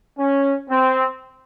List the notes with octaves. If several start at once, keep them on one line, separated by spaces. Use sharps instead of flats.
C#4
C4